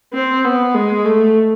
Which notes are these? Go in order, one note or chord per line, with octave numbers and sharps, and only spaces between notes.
C4
B3
G#3
A3